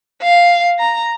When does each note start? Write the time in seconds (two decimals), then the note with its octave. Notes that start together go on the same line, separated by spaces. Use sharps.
0.23 F5
0.79 A#5